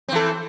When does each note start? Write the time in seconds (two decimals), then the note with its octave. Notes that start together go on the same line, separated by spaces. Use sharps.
0.08 C4
0.12 E3
0.16 A4